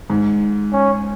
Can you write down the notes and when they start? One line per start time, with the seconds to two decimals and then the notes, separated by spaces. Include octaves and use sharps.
0.10 G#2
0.73 C#4